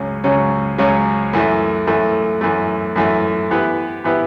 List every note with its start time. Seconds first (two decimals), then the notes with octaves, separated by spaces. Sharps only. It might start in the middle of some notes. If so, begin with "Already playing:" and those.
Already playing: C#2 C#3 F#3 C#4
0.24 C#2 C#3 F#3 C#4
0.78 C#2 C#3 F#3 C#4
1.33 F#2 E3 A3
1.87 F#2 E3 A3
2.41 F#2 E3 A3
2.96 F#2 E3 A3
3.50 E3 B3 E4 G4 B4
4.04 E3 B3 E4 G4 B4